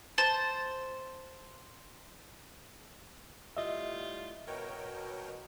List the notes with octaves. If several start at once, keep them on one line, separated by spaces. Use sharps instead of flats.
C5 A5
A2 G3 F4 D#5 E5
B2 A#4 C#5 G5